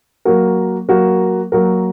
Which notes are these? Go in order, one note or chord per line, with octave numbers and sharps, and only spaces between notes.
F#3 A#3 F#4 A#4
F#3 A#3 F#4 A#4
F#3 A#3 F#4 A#4